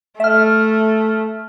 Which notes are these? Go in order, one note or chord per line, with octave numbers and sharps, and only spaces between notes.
A3 E5 F6